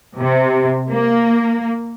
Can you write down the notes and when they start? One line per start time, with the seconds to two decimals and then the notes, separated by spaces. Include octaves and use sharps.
0.18 C3
0.92 A#3